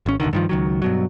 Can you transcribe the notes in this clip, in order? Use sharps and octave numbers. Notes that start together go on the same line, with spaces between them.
G#1 C#4
E1 A1 D3 D#3
G2 D#3 F3
C#2 D#3 F#3
G2 B2 F#3